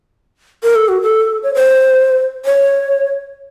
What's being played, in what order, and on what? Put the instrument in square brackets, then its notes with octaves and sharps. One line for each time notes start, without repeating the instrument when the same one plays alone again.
[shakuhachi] A#4
A4
F#4
A4
C#5
C5
C#5